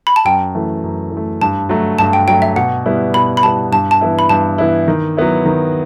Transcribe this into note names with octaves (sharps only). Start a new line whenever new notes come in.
B5
A5
F#2 G5
E3 A3
F#2
E3
A3
G2 A5
F#3 A3
G2 A5
G5
F#3 A3 G5
E5
B2 F#5
G3 B3 E4
B2 B5
B5
G3 B3 E4 A5
G2 A5
A5
E3 B3 E4
B5
G2 A5
E3 B3 E4
D#3
F#3 B3 E4
D#3